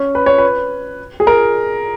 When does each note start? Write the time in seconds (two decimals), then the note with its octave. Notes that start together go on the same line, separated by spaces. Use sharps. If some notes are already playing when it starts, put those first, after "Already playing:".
Already playing: C#4
0.15 B4
0.26 C#5
0.38 B4
1.20 G#4
1.27 A#4